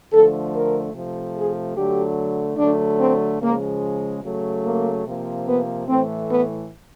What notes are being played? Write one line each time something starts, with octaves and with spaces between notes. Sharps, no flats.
D3 F3 A3 A4
A#4
C3 F3 A3
G#4
D3 F#3 A3 G4
D3 F#3 A3 D4
C4
C#3 F3 G#3 A#3
C#3 F#3 A3
A#3
C3 F3 A#3
B3
A2 E3 A3 C4
B3